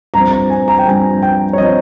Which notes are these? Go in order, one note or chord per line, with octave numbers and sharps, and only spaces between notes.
G2 F3 C4 A#5
A#5
G#5
A#5
G5
G2 F3 C4 G#5
G5
C#5
F3 C4 D#5